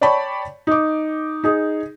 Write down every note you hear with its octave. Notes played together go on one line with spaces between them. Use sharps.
C#5 D5 G5 A5 B5 C#6
D#4 D6
D#4 G#4